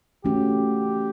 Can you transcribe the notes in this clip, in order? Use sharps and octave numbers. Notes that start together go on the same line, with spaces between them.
E3 A3 C#4 F#4 G4